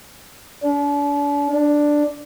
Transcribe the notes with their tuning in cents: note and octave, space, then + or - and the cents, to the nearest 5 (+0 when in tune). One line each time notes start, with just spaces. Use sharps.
D4 -40
D4 +5